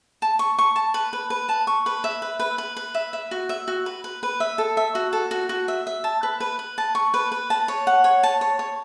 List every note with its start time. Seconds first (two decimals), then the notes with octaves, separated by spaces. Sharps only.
0.22 A5
0.39 C#6
0.59 C#6
0.76 A5
0.94 B4
1.13 B4
1.30 B4
1.49 A5
1.67 C#6
1.86 B4
2.04 E5
2.22 B4
2.39 B4
2.58 B4
2.77 B4
2.95 E5
3.13 E5
3.31 F#4
3.49 E5
3.68 F#4
3.86 B4
4.04 B4
4.23 B4
4.40 E5
4.58 A4
4.77 E5
4.95 F#4
5.13 A4
5.31 F#4
5.49 F#4
5.68 E5
5.87 E5
6.04 A5
6.23 B4
6.40 B4
6.59 B4
6.78 A5
6.95 C#6
7.14 B4
7.32 B4
7.50 A5
7.68 C#5
7.87 F#5
8.04 C#5
8.23 A5
8.41 C#5
8.59 C#5